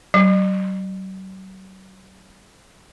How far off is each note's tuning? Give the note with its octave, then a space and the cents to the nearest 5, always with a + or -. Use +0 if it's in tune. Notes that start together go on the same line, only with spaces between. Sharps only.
F#3 +45